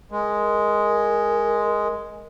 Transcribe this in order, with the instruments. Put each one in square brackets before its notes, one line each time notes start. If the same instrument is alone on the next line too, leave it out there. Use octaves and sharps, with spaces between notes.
[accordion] G#3 [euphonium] A#4